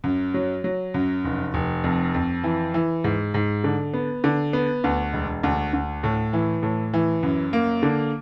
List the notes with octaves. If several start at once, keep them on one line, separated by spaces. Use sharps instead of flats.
F#2
F#3
F#3
F#2
F1
F1
F2
F2
E3
E3
G#2
G#2
D3
B3
D3
B3
D2
E1
D2
D2
A2
E3
A2
E3
F#2
A#3
D3